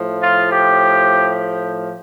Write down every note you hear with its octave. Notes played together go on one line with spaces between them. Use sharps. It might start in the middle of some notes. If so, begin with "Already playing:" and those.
Already playing: A2 F3
F4
G4